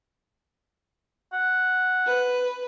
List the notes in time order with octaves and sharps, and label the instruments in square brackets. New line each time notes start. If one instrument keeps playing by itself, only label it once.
[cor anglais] F#5
[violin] B4